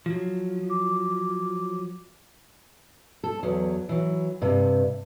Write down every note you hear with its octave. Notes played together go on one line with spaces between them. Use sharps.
F3 F#3
D6
A4
E2 F#3
E3 F#3
G2 C3